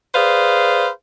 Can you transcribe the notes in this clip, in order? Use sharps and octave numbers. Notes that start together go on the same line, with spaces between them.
G#4 B4 C5 D5 F5